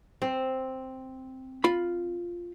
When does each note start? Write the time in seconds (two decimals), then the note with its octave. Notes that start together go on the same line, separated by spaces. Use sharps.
0.22 C4
1.64 F4 B5